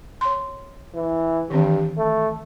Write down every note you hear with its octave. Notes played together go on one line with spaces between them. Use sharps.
C#5 C6
E3
G2 D#3 E3 C4
A3